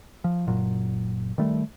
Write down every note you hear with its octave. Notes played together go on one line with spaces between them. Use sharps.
F3
F#1 A#2 F#3
D#3 G3 A3